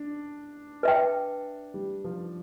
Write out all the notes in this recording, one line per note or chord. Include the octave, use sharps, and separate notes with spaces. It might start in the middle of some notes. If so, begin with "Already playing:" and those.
Already playing: D4
B4 E5 G5
G3
F3